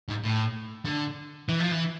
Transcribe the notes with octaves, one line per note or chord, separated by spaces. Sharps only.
G#2
A2
D3
E3
F3
E3